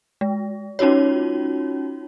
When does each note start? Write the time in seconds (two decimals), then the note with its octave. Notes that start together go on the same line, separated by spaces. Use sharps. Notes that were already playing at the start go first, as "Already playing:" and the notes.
0.21 G#3
0.79 C#4 D#4 F4 F#4 C#5